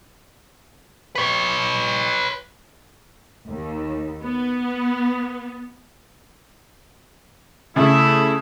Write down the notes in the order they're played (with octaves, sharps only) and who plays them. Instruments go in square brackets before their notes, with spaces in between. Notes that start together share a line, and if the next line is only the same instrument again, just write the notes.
[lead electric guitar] B4 C#5
[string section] D#2
B3
[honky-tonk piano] C#3 [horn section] A3 E4